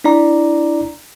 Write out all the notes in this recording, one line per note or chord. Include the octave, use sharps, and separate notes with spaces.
D4 E4 D5 A#5